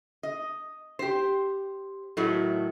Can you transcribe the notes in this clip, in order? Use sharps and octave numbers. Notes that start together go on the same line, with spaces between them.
D#5
G4 C5
A2 D#3 F#3 A3 E4